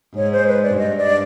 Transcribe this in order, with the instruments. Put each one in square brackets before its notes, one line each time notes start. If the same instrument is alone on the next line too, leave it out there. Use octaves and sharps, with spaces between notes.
[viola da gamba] G#2 [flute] C#5
[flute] C5
B4
D5
[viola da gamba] G2 [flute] D#5
[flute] D5